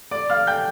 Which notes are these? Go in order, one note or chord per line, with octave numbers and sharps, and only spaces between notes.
D5 D6
F5 F6
G5 G6